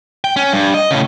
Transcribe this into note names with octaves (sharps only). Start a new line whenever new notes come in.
G5
C#4
G2
D#5
A2 C#3